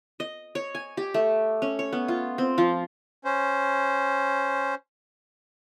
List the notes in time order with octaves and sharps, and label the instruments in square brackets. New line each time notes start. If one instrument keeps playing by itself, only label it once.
[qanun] D#5
C#5
G#5
G4
A3
C#4
C#5
B3
F4
C4
F3
[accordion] C#4 C5